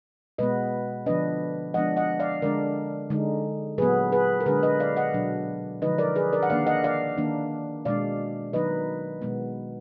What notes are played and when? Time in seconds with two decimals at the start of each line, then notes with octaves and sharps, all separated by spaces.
0.38 B2 G#3 B3 B4 D#5
1.06 D3 F3 B3 D4 B4 D#5
1.74 F3 G#3 B3 D4 D#5 F#5
1.97 D#5 F#5
2.20 D5 F5
2.42 D3 G#3 D4 A#4 D5
3.10 D3 G#3 D#4
3.78 A#2 F#3 B3 G#4 B4
4.12 G#4 B4
4.40 A#4
4.46 D3 G#3 D4 G#4 B4
4.63 B4 D#5
4.80 D5 F5
4.97 D#5 F#5
5.14 B2 F#3 D4
5.82 D3 F3 G#3 D#4 B4 D#5
5.98 A#4 D5
6.15 G#4 B4
6.33 A#4 D5
6.43 F#5
6.50 D#3 A#3 D4 D5 F5
6.67 D#5 F#5
6.84 D5 F5
7.18 D#3 A#3 D4
7.85 B2 G#3 D4 D5 F5
8.53 D#3 F#3 B3 D#4 B4 D#5
9.22 B2 G#3 B3